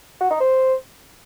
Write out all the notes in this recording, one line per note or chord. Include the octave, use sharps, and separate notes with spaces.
F#4
D#4
C5